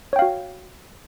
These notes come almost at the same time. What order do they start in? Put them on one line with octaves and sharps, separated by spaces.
C#5 G5 F5 F#4